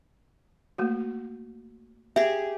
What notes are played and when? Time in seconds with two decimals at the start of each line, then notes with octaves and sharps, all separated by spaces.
0.78 A3 A#3 F#4
2.16 G4 G#4 E5